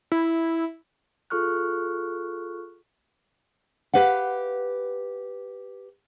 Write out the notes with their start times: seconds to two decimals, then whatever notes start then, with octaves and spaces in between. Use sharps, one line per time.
0.12 E4
1.30 F4 G#4 A4 C#6 F6 F#6
3.94 G4 B4 F5 F#5